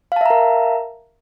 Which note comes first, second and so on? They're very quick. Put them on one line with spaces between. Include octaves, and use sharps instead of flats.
F5 A5 E5 A#5 A#4